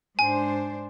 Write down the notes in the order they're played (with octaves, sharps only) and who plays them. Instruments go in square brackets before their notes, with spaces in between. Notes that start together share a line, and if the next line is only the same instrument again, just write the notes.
[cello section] G#2 D4 C5 [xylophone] G#5